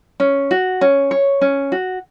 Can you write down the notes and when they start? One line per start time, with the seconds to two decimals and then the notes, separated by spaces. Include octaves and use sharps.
0.20 C#4
0.51 F#4
0.81 C#4
1.11 C#5
1.41 C#4
1.72 F#4